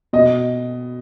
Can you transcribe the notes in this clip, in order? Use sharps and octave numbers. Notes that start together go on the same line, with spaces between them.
B2 D#5